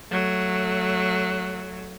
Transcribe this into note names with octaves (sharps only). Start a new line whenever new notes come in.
F#3 A3